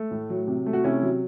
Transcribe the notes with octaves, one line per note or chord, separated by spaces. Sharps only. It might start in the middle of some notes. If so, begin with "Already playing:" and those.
Already playing: A3
A2
F#3
C3
A3
F#4
C3 C#4 E4
F#3